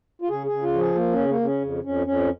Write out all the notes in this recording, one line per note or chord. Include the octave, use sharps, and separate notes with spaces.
F4
C#3 G#4
C#3 G#4
F4
F3
G#4
A#3
C#4
C#3
A#3
C#3 C#4
F2
F2 C#4
F2 C#4